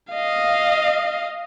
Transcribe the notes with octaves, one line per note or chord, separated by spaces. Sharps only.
D#5 F5